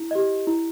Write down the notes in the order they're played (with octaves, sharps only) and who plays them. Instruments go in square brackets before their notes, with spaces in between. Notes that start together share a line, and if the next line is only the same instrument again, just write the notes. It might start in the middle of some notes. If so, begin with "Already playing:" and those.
Already playing: [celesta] E4
G4 D#5
E4